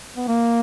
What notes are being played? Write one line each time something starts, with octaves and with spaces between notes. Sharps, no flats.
B3
A#3